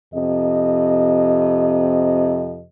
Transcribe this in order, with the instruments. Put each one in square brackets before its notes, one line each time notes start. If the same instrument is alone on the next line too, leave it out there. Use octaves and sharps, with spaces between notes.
[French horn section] F2 C3 D#5